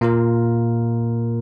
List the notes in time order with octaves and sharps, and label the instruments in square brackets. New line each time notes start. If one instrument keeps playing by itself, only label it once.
[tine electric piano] A#2 A#3 F4 A#4